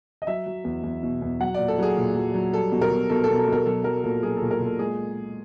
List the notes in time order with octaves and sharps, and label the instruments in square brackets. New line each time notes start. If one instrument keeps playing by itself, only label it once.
[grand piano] D#5
F#3 E5
F#3
E2
E2
B2
E2
F#3 F#5
A#2 D5
A4
F#3 G#4
A#2
F#3
F#3
G3 A4
B2
A#4
B2
B2 A4
B2 A4
A4
B2 A#4
F#3 A4
F#3 A#4
A#2 A4
F#3 G#4
A#2 A4
A#4
A#2 A4
G#3 G#4